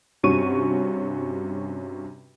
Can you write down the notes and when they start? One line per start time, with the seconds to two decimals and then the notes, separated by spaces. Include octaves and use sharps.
0.23 G2 C3 C#4 F#4 C#6 D#7